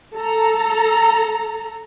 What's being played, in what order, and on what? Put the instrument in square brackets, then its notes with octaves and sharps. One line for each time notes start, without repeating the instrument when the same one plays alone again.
[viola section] A4 A#5